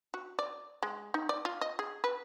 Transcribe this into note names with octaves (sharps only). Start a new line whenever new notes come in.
F#4
D5
G#3
D#4
D5
F4
D#5
G#4
B4